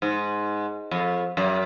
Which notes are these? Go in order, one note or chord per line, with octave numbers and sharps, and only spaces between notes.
G#2
F2
F#2